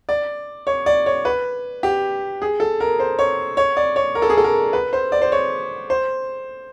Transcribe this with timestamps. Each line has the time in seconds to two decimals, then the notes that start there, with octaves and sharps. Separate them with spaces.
0.09 D5
0.67 C#5
0.86 D5
1.06 C#5
1.25 B4
1.83 G4
2.42 G#4
2.60 A4
2.80 A#4
2.99 C5
3.19 C#5
3.57 C#5
3.77 D5
3.96 C#5
4.15 A#4
4.22 A4
4.30 G#4
4.37 A4
4.44 A#4
4.73 B4
4.93 C5
5.12 D5
5.22 C5
5.32 C#5
5.90 C5